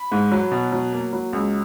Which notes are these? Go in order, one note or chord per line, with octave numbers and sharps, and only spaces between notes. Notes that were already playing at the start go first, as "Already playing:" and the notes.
Already playing: B5
G#2
F#3
B2
F#3
A#3
F#3
C#2